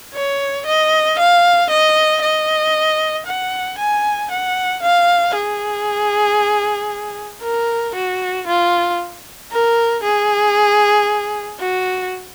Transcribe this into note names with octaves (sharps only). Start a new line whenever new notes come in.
C#5
D#5
F5
D#5
D#5
F#5
G#5
F#5
F5
G#4
A#4
F#4
F4
A#4
G#4
F#4